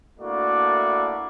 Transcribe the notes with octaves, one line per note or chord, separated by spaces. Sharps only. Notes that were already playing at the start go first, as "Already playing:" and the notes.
A3 A#3 D4 E4 F#4 D5